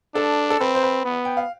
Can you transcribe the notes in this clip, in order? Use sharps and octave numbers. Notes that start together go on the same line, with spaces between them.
D4 A4
A4
C4 B4
C5
B4
B3
G5
F5